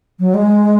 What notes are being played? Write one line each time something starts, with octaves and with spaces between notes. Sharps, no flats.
F#3
G#3